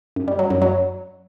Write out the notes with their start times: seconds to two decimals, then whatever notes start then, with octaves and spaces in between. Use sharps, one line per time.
0.16 F#2
0.28 G3
0.39 F#3
0.50 F#2
0.62 F#3